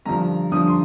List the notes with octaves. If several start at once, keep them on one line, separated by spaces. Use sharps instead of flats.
G2 D3 F3 A#5
G2 D3 F3 D#6
C6